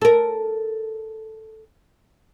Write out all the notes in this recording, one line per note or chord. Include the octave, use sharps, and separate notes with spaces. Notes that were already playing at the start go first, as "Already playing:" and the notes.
A4 A#4